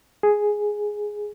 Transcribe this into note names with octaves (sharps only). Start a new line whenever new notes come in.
G#4